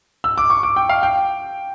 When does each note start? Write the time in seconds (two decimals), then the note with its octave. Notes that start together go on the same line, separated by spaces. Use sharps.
0.24 E6
0.38 D6
0.50 C#6
0.63 D6
0.76 G5
0.89 F5
1.03 G5